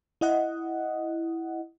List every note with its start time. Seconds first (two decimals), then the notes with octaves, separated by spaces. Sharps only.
0.21 E4 D#5 F#5